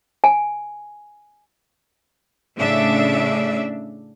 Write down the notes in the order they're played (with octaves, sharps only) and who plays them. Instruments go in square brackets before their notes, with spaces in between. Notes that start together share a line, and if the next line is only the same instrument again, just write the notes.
[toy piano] G#5
[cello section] A2 C#3 D4 E5